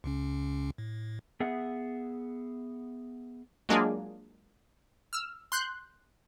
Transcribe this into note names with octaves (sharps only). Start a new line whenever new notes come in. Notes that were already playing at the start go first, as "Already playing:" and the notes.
C#2 C#3 C#4
A2
B3 G#4 E5 F#5
F#3 G#3 A#3 D4 F4 G#4
E6 F6
C6 F#6 G6